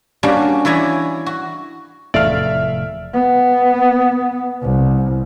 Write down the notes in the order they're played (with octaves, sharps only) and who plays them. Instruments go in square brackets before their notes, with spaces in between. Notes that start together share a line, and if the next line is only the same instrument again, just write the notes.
[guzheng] G3 A#3 C#4 D4 F#4 G4
E3 E4 C#5 D5 G#5 A#5
F#4
[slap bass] F1 [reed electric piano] E2 A2 A3 [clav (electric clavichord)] D5 F5 [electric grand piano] E5 F6
[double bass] B3
C2